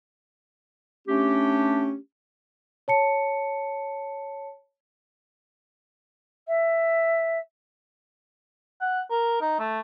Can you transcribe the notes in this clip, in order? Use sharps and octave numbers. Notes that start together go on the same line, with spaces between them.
A3 C#4 D4 G4
C#5 A5 C#7
E5
F#5
A#4
D#4
A3